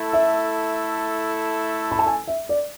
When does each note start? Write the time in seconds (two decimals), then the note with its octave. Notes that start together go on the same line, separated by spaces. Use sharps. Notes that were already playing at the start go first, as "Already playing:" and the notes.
Already playing: A3 E4 A4
0.13 E5
1.92 B5
1.99 A5
2.07 G#5
2.27 E5
2.49 D5